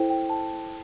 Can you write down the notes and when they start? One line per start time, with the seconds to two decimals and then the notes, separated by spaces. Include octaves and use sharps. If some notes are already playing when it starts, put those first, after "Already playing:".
Already playing: E4 A4 C5 G5
0.10 G5
0.30 A5